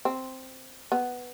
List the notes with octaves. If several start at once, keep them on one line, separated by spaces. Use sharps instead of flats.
C4
B3